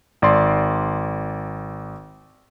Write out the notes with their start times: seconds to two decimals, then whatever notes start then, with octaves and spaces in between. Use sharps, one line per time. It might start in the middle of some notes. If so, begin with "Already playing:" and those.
0.22 G#1 D5 C6